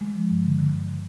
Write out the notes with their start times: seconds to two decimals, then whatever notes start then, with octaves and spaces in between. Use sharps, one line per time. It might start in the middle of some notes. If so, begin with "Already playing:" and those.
0.01 G#3
0.15 F3
0.30 G2
0.44 D3
0.59 D3
0.74 G2
0.88 D3